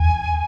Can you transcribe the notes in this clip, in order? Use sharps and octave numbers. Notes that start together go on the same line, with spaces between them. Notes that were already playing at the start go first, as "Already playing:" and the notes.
Already playing: E2 G#5